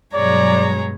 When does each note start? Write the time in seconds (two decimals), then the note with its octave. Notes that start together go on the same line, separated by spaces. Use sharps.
0.14 G2 B2 F#3 G#3 C#5 D5 A#5